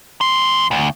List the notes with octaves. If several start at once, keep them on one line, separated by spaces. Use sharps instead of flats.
E2 C6
D2